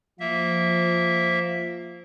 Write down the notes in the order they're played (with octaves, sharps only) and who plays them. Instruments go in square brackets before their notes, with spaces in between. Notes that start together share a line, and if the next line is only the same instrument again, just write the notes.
[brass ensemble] F3 [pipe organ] A#3 E5